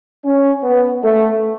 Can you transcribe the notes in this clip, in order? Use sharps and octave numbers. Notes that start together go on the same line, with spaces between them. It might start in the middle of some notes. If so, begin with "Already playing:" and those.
C#4
B3
A3